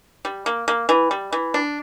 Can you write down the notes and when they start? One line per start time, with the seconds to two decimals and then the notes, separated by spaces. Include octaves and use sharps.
0.25 G3
0.46 A#3
0.68 A#3
0.89 E3
1.11 G3
1.33 E3
1.54 D4